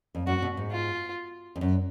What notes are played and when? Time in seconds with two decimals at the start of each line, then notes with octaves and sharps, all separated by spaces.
0.15 F2
0.27 F#2 F#4
0.42 B2
0.57 G#2
0.72 F4
1.56 F2
1.61 F#2